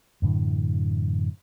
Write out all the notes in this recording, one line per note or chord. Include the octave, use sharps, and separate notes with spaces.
F#2 A2 D3 E3